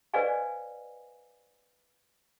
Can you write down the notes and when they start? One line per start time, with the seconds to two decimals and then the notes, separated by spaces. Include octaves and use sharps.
0.14 B4 C5 D5 D#5 F5 G#5